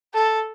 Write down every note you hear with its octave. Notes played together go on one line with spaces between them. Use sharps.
A4